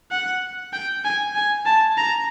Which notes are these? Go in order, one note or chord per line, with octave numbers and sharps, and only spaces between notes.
F#5
G5
G#5
G#5
A5
A#5